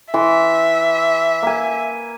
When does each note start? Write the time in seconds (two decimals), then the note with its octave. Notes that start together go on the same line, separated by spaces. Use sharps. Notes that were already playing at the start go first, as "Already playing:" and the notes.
0.14 E3 E5 C6
1.42 A#3 G#5